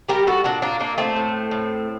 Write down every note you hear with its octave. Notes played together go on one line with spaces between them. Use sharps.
G3 G4 A#4
F#4 A4
A#2 D4 F#4
A#3 D4
A#2 A#3 D4
A3 C4
A2
A2